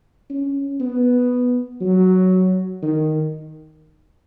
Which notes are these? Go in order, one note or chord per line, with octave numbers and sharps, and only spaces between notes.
C#4
B3
F#3
D#3